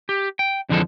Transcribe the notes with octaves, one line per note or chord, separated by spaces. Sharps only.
G4
G5
F2 D3 E3 F3 G#3 A4